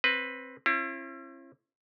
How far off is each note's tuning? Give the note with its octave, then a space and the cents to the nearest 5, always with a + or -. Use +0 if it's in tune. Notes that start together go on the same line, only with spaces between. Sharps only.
C4 +15 B4 +0
C#4 -45 E4 +40